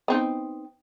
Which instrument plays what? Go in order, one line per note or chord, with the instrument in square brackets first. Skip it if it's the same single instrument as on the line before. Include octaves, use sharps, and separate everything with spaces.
[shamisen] B3 C4 D#4